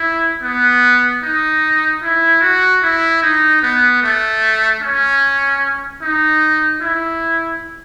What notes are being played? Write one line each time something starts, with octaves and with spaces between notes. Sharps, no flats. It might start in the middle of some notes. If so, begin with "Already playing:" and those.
Already playing: E4
B3
D#4
E4
F#4
E4
D#4
B3
A3
C#4
D#4
E4